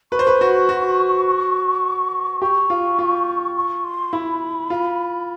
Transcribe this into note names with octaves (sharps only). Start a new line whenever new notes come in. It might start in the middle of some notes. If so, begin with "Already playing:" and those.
B4 C#6
C5
B4
F#4
F#4
G4 C#6
F4
F4
C#6
C6
E4 B5
F4